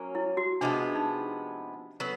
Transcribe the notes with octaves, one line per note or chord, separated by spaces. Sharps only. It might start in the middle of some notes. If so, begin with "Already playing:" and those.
Already playing: F#3 A#3 C#4
E4
F#4
C3 F3 G#3 B3 D4
D#4
F#3 B3